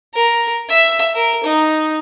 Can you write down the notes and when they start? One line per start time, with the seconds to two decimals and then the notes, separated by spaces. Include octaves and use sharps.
0.14 A#4
0.69 E5
1.14 A#4
1.44 D#4